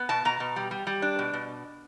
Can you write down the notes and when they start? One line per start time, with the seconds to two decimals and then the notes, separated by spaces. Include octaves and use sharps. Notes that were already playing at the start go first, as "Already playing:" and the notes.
Already playing: B3
0.09 B2 A5
0.25 B2 A#5
0.40 B2
0.56 G3
0.71 G3
0.87 G3
1.02 D4
1.19 B2
1.33 B2